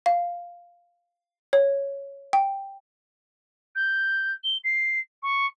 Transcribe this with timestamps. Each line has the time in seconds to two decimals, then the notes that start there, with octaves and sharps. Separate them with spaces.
0.06 F5
1.53 C#5
2.33 G5
3.75 G6
4.43 G7
4.64 C7
5.22 C#6